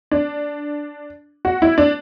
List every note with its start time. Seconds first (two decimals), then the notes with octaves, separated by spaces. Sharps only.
0.11 D4
1.45 F#4
1.62 E4
1.78 D4